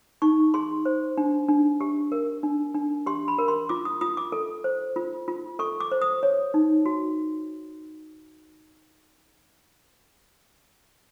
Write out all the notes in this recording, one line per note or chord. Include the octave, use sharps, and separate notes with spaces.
D#4 C#6
G#4 C6
C5
D4
D4
G4
A#4
D4
D4
G4 C6
B5
A#4
C6
F4 D6
D#6
F4 D#6
D6
A4
C5
F4
F4
A4 C#6
D6
C5
D#6
C#5
D#4
F#4